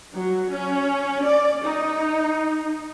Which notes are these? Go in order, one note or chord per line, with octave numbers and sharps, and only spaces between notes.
F#3
C#4
D5
D#4